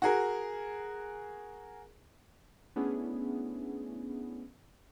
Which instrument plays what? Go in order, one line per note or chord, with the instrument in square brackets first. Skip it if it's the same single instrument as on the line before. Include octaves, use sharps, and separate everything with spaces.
[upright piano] F#4 G#4 A#4
[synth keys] A3 B3 C#4 D4 E4 G#4